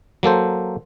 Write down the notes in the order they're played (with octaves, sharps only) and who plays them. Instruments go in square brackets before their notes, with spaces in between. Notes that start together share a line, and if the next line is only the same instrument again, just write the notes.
[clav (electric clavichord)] F#3 A#3 A4 C5